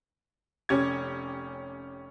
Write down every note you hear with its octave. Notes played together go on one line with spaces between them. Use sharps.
F1 C#4 G4 G#6